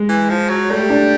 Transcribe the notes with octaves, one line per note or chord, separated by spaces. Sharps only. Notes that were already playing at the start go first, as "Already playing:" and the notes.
Already playing: G#3
E3
F3
F#3
G3 A3
D4